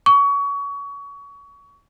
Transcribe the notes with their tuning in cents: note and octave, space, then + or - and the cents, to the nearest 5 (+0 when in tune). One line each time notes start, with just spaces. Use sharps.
C#6 +30